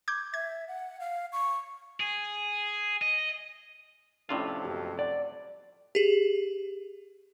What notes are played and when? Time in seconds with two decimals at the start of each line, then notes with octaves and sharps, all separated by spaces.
0.08 D6 G6 G#6
0.34 E5 G#6
0.68 F#5
1.00 F5
1.33 C#6
2.00 G#4
3.02 D#5
4.29 F2 A2 C3 C#4 D4 E4 F4
4.64 F#1 B2 G4
4.99 D5 F#5
5.95 G4 G#4